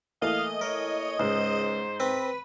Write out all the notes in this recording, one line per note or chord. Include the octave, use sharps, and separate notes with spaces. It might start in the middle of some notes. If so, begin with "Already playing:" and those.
E3 A3 A#3 D#5 F5
A#4 C#5
C#2 G#2 C5
C4 B4